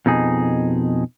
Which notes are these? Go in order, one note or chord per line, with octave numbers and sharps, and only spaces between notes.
F2 B2 D#4 G#4